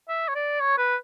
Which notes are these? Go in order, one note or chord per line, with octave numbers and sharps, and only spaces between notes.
E5
C#5
D5
C#5
B4